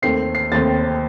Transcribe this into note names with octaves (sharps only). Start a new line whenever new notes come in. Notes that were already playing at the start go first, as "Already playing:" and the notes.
D#2 D#3 A3 C4 C7
C7
D#2 D#3 A3 C4 A6